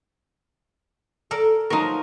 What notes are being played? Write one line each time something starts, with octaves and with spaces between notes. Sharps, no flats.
A4 A#4 D5
F3 F#3 D#4 A#4